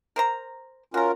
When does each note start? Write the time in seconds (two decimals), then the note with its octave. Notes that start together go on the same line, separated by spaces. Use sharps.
0.16 A#4 C5 A#5
0.94 C#4 F4 F#4 A#4 A#5